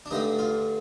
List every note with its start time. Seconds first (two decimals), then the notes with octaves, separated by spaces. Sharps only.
0.06 D4
0.11 G2 D3 A3 D#4
0.39 F4